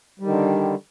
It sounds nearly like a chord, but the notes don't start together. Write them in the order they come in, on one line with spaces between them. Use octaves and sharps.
G3 D#3 D3